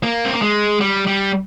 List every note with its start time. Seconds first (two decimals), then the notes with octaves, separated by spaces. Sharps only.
0.03 A#3
0.25 C4
0.33 A#3
0.42 G#3
0.81 G3
1.07 G3